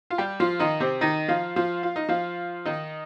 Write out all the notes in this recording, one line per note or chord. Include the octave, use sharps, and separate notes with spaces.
F4
G3 G4
F3 F4
D#3 D#4
C3 C4
D#3 D#4
F3 F4
F3 F4
F4
D#4
F3 F4
D#3 D#4